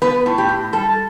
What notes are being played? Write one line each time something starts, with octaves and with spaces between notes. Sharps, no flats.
B3 B4
A2
G4
A2
G3 A4